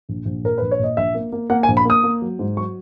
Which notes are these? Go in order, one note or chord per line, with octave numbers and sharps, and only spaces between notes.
A#1
A#1
A#2 A#4
A#1 B4
C#5
A#2 D#5
A#1 E5
A#3
A#3
A#3 F#5
G#5
A#1
B5
A#3 D#6
A#3
F#3
G#2
F#3 C#6